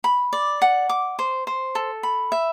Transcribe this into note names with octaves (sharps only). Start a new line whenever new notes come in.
B5
D5
F#5
D6
C5
C5
A4
B5
E5